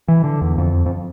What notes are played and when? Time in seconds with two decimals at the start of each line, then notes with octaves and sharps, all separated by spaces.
0.08 E3
0.24 D3
0.41 E2
0.58 F2
0.86 F2